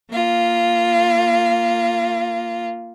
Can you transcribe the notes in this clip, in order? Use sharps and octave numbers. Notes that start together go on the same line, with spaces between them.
A#3 F4